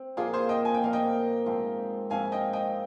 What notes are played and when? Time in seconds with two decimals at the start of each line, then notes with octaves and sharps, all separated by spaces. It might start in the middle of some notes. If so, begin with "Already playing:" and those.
Already playing: C4
0.17 A#2 F3 A#3 F4 G#4
0.33 G#4 C5
0.49 D#5 G5
0.65 G#5
0.74 G5
0.82 A#2 F3 A#3 F5
0.93 D#5 G5
1.46 G#2 F3 C4
2.10 G#2 F3 C4 F5 G#5
2.32 D#5 G5
2.53 D#5 G5